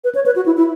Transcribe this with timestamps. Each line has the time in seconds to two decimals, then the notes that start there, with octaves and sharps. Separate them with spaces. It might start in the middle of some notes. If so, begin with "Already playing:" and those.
0.04 B4
0.15 C#5
0.26 B4
0.36 F#4
0.46 E4
0.57 E4